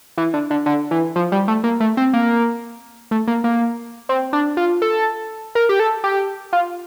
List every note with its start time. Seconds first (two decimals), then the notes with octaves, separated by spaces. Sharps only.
0.18 E3
0.34 D3
0.50 D3
0.66 D3
0.91 E3
1.16 F3
1.32 G3
1.48 A3
1.64 A#3
1.80 A3
1.97 C4
2.13 A#3
3.11 A3
3.27 A#3
3.44 A#3
4.09 C4
4.33 D4
4.57 F4
4.82 A4
5.55 A#4
5.69 G4
5.80 A4
6.04 G4
6.53 F4